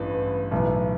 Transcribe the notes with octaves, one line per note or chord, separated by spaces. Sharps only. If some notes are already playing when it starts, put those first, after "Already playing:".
Already playing: A1 G2 B4
B1 A2 E3